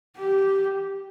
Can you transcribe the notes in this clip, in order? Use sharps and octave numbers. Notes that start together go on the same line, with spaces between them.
G4